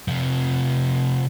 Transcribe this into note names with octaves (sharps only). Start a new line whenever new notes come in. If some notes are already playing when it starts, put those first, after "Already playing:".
C3 F3